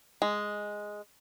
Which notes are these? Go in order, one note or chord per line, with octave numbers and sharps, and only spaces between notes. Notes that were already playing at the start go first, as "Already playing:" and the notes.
G#3